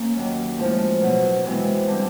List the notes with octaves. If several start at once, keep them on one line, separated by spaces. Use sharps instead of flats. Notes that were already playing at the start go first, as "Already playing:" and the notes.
Already playing: A#3 C#4
D#2 D#3 F#3
A2 F3 G#3
B2 F#3 B3
C3 E3 G#3 B3
D3 G3 C4